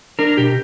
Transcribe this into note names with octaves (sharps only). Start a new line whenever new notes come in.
D4 A#4
B2 G4